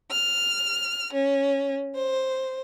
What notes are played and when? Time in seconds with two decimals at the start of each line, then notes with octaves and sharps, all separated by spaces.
0.11 F6
1.13 C#4
1.95 C5